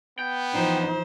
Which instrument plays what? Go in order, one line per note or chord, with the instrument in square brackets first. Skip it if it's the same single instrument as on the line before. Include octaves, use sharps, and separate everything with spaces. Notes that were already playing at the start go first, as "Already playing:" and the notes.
[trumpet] B3 [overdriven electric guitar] G5
[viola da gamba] E3 F3 C5 [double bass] D#4